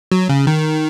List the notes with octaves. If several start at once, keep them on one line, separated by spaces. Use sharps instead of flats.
F#3
C#3
D#3